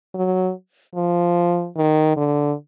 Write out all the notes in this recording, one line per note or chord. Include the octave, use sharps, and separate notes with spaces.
F#3
F3
D#3
D3